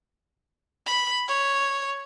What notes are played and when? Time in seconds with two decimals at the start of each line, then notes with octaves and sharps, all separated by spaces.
0.86 B5
1.28 C#5